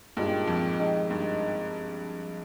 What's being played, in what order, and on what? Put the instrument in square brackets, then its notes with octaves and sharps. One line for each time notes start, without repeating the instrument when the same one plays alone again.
[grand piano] G2 [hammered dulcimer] A#2 G#3 D#4 G4
[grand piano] F2
[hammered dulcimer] D#3 G#3 D#4
[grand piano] G2